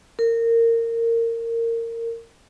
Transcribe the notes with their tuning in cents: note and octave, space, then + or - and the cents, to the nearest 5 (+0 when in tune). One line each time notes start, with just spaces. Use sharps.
A#4 -20